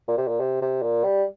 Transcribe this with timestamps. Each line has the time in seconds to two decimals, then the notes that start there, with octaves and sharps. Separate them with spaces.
0.08 A#2
0.18 C3
0.28 A#2
0.40 C3
0.62 C3
0.83 A#2
1.04 G3